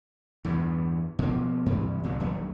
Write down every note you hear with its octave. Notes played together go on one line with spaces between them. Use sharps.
E2 G2 E3
B2 F3 A#3
G2 C3 E3
C2 A#2 D3 F#3
A#1 D#2 F#3 A3